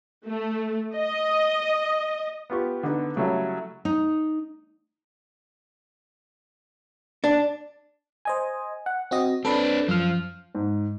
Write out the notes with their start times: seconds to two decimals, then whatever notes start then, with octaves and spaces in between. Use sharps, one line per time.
0.26 A3
0.95 D#5
2.50 B3 F4 G4 C#6
2.83 D3 B3 D#4
3.16 C#3 F#3 G3 A3 C#4 E4
3.85 D#4
7.24 D4
8.25 C5 D#5 G#5
8.86 F#5
9.11 C4 F#4 D#5
9.45 C4 D4 A4 B4
9.88 F#2 F3 F6
10.55 G#2